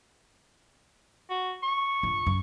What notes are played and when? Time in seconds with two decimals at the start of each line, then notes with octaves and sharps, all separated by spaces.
1.30 F#4
1.63 C#6
2.03 G2 F4
2.26 F#2